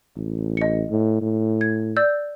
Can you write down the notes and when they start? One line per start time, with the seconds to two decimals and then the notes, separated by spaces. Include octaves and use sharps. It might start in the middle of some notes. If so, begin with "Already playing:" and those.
0.16 A1
0.57 D#5 C#7
0.90 A2
1.21 A2
1.61 G#6
1.96 D5 E6 G6